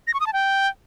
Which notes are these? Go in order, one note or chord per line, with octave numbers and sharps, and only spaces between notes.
A#6
C#6
D#6
A5
G5